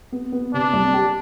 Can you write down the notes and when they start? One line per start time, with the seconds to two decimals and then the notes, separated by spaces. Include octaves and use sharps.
0.12 B3
0.32 B3
0.53 C3 D4
0.73 C2
0.94 G4